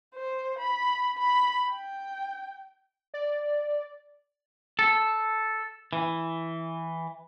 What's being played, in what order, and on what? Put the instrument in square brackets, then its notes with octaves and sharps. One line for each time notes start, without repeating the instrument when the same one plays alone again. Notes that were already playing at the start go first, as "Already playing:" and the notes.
[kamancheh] C5
B5
B5
G5
[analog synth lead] D5
[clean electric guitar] A4
E3